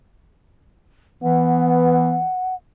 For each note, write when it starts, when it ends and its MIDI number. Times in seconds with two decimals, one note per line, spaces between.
1.23 2.24 52
1.23 2.15 59
1.23 2.55 78